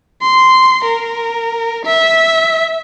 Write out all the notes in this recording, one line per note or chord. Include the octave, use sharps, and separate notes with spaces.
C6
A#4
E5